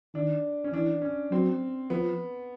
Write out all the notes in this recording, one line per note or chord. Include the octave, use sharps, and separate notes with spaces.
D#3 D4
C#4
E3 D4
C#4
F#3 C4
F3 B3